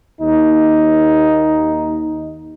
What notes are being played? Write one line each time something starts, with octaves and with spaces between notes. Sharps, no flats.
D#2 D#4